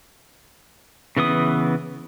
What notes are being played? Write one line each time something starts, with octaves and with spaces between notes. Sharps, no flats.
C#3 E3 B3 D#6